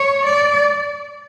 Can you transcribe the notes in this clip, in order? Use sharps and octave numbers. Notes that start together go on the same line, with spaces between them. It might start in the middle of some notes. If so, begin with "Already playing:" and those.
Already playing: C#5
D5